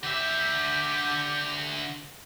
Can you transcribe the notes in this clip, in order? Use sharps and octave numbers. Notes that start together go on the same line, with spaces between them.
D3 G4 E5